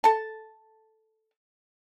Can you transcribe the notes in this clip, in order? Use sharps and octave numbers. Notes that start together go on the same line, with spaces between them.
A4 A5